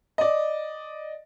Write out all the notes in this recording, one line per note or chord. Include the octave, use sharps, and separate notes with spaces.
D5 D#5